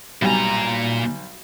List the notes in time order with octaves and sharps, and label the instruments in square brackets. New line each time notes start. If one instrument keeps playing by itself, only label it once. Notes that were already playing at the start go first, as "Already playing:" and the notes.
[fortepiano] B1 G3 G#5 [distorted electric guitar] A#2 A#5